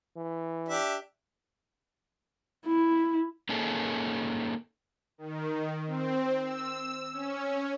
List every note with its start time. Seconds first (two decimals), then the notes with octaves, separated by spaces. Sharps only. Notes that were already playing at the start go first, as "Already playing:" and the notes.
0.16 E3
0.69 D4 G4 E5
2.66 E4
3.49 A#3 C#4 D#4 G#4 A4
5.18 D#3
5.87 C4
6.43 E6
7.12 C#4